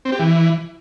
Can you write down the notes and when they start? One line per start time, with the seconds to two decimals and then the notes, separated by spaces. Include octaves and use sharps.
0.05 C4
0.12 G4
0.19 E3